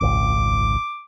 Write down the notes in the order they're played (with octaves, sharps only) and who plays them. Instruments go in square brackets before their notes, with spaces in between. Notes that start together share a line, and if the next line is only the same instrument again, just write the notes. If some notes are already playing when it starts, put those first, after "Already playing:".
[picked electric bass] D#1 G#1 C#2 [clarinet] D6